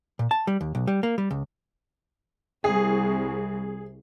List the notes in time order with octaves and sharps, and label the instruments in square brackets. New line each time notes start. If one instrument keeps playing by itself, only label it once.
[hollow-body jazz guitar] A#2
A5
G3
D#2
B1
G3
A#3
G3
C#2
[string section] C2 [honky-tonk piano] G#4